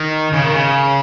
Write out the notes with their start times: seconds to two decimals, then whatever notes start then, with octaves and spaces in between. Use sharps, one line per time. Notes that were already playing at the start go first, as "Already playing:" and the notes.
Already playing: D#3
0.33 C#3
0.44 D#3
0.53 C#3